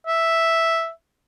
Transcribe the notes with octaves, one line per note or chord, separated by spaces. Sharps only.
E5